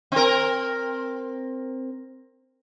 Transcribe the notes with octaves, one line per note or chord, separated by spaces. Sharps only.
C4 A#4